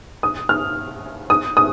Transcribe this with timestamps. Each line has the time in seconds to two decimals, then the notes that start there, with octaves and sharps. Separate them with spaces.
0.23 D#6
0.49 F6
1.30 D#6
1.57 D#6